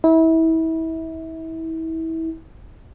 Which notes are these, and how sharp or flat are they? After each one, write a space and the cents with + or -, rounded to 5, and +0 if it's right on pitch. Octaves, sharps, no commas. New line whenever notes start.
E4 -30